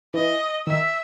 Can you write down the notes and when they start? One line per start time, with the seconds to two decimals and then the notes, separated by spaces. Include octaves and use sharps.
0.14 E3 D#5
0.67 D#3 E5